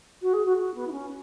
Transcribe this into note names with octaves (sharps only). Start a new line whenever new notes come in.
F#4
G#4
F#4
F#4
B3
E4
C#4